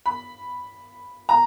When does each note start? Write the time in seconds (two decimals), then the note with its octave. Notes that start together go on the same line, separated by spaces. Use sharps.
0.06 B5
1.29 A#5